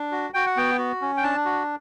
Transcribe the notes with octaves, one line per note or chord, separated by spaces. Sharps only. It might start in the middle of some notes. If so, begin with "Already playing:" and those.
Already playing: D4
F#4
F#4 G5
F#5
B3 G5
F#4
C#4
G5
D4 A5
F#4